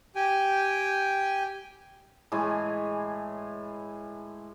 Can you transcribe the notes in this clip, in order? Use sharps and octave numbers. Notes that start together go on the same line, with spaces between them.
G4 G5 G#5
A2 E3 G#3 G#5